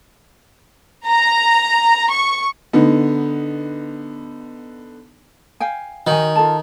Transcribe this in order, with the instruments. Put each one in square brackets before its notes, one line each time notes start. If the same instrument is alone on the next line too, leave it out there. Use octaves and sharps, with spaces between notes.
[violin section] A#5
C#6
[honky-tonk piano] D3 B3 D#4
[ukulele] F5 G5 G#5
[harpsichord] D#3 [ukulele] D#4 F#4 G#5
[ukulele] F4 A4 A5